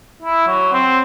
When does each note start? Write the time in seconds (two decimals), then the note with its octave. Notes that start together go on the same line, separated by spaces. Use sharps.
0.23 E4
0.47 F#3
0.73 C4